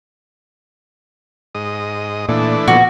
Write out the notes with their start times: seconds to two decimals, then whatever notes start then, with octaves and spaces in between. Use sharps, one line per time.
1.55 G#2 D#5
2.29 A#2 E3 A3 D4
2.68 A#2 F3 B3 F#4